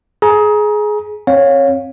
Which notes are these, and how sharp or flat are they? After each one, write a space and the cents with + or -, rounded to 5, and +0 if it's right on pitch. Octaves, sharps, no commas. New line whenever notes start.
G#4 +20 A#5 +25
C4 +25 C#5 +0 F5 +25